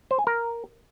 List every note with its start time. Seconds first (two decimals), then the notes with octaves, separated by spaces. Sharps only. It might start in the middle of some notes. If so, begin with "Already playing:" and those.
0.11 C5
0.19 G#5
0.27 A#4